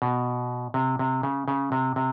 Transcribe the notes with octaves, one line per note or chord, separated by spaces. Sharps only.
B2
C3
C3
C#3
C#3
C3
C3